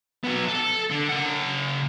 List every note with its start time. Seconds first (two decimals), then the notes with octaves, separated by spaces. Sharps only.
0.24 F#3 B3
0.48 A4
0.90 D3
1.09 C#3 F#5